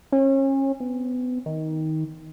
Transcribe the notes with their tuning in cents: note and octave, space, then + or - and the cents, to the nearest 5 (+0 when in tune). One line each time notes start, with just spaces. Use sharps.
C#4 -35
B3 +25
D#3 +15